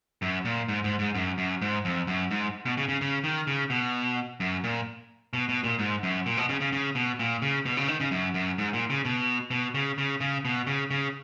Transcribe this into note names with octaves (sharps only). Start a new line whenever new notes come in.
F#2
A#2
G#2
G#2
G#2
F#2
F#2
G#2
F2
F#2
G#2
B2
C#3
C#3
C#3
D#3
C#3
B2
F#2
A#2
B2
B2
A#2
G#2
F#2
A#2
B2
C#3
C#3
C#3
B2
A#2
C#3
B2
C#3
D#3
C#3
F#2
F#2
G#2
A#2
C#3
B2
B2
C#3
C#3
C#3
B2
C#3
C#3